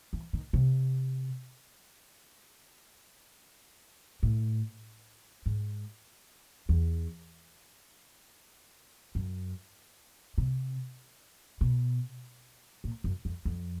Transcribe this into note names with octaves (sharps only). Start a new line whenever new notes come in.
E3
D#3
C3
A2
G#2
E2
F#2
C3
B2
A#2
F#2
F2
F2